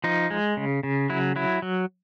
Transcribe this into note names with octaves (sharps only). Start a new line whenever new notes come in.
F3 D#4
G#3
C#3
C#3
F#3 E4
F#3 E4
F#3